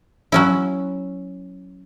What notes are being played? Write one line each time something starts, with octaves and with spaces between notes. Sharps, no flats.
F#3 C#4 E4